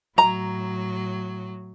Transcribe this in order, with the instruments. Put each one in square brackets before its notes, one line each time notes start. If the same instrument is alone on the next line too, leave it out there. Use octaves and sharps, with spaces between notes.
[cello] A2 F#3 [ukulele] A#5